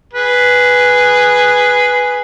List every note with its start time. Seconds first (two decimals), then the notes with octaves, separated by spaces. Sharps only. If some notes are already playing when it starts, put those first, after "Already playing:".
0.13 G#4 B4